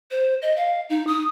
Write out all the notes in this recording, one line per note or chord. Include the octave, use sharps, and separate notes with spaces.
C5
D#5
F5
D#4
D#6